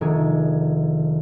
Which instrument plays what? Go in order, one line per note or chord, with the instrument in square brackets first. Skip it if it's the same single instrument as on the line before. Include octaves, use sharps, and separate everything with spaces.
[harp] F1 D#3 D4 G#4 C#5